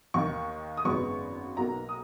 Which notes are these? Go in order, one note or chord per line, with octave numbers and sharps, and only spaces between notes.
D#2 D#3 A#3 C#6
D#6
G#1 F#2 C#3 G#3 B3 C#6
B1 B2 A#3 A#5
D#6